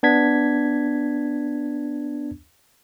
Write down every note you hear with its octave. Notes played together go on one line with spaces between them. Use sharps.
B3 D4 G#6 B6